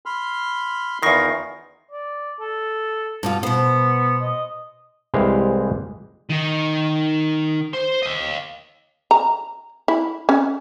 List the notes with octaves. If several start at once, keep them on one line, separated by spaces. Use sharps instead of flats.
B5 C6 F6
E2 D#3 E4 F4 A#4 C#6 A#6 C7
D5
A4
G2 B2 F4
B2 B3 C5
D#5
C2 E3 G#3 G4 C5 F5
D#3 D#4
C5 C6
D#5 F5
A#5
E4
C#4